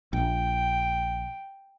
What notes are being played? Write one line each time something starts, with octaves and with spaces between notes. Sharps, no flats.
A#1 G5